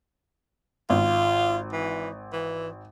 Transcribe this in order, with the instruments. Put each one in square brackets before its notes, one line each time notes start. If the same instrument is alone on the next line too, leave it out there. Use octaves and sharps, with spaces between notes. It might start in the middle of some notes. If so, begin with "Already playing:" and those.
[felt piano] G#1 [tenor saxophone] F4
[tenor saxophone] E3
E3